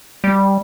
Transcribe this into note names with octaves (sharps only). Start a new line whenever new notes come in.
G3